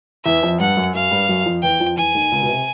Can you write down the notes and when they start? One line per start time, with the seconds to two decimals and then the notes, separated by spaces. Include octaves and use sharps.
0.25 E2 E3 E5
0.43 F2 F3
0.60 G2 G3 F#5
0.77 F#2 F#3
0.94 F#2 F#3 F5
1.11 G2 G3
1.29 F#2 F#3
1.46 F2 F3
1.63 E2 E3 G5
1.80 F2 F3
1.97 E2 E3 G#5
2.14 D#2 D#3
2.32 C#2 C#3
2.42 B2
2.49 C3